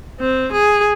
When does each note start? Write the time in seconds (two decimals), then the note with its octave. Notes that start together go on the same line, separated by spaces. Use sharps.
0.20 C4
0.52 G#4